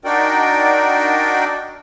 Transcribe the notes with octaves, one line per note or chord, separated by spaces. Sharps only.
D4 D#4 F#4 A#4 D5 G5